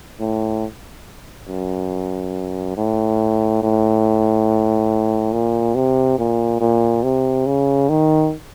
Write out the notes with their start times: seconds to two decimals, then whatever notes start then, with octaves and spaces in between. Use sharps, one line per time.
0.20 A2
1.48 F#2
2.77 A2
3.63 A2
5.33 A#2
5.75 C3
6.18 A#2
6.61 A#2
7.03 C3
7.46 C#3
7.89 D#3